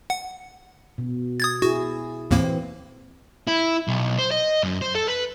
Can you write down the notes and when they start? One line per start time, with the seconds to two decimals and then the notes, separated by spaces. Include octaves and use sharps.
0.10 F#5
0.98 B2
1.40 D#6 G#6 A6
1.62 E4 F#4 G#4
2.31 D#2 A2 E3 A#3 C4
3.47 E4
3.88 B1
4.19 C5
4.31 D#5
4.63 F#2
4.81 C5
4.95 A4
5.07 B4